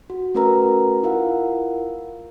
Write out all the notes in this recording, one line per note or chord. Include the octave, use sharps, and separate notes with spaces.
F#4
A3 C#4 F#4 A#4 B4 A#5
E4 F4 A#4 F5 F#5